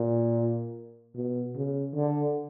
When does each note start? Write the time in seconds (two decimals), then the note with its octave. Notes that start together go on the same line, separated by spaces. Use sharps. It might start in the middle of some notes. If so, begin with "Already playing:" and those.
Already playing: A#2
1.15 B2
1.56 C#3
1.95 D3